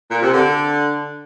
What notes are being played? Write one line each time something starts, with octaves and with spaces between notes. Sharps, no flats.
A#2
C3
D3